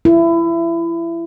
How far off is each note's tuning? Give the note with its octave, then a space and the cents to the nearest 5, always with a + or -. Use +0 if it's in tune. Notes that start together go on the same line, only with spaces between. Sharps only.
E4 +25